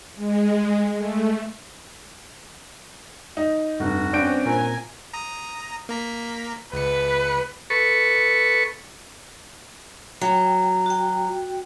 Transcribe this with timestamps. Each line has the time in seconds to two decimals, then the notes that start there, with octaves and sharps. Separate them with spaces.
0.16 G#3
0.97 A3
3.37 D#4
3.80 F1 G2 F#4
4.13 G2 C4 C#4 D5 G5 C#6 G6 D7
4.46 A#2 A#4 G#5
5.14 A#5 D#6
5.89 A#3 A#5 B6
6.73 C#2 B4 C#7
7.70 A4 B4 C#6
10.21 F#3 G5
10.86 F#4 G5